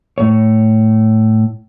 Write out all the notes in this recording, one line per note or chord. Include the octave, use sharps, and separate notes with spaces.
A2 C#5